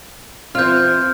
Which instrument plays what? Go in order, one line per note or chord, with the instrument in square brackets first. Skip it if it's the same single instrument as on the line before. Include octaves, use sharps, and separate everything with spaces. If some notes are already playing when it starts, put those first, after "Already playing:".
[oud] E3 F4 [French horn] C4 [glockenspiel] F6 G6